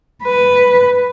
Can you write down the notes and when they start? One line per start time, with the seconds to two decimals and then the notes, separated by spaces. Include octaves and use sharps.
0.24 B4